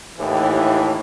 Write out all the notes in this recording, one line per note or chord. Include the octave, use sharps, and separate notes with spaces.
D#2 A2 E3 G4